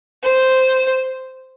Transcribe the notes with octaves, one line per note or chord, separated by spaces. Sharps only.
C5